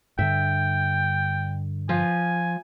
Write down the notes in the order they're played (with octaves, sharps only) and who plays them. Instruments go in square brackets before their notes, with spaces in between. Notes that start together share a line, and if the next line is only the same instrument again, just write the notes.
[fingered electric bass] G2 D3 [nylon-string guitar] E5 [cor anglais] G5
[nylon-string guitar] F3 [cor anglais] G#5